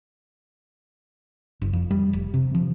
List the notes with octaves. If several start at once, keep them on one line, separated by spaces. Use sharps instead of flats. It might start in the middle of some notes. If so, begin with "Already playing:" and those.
F#1
F2
G3
F1
C3
F3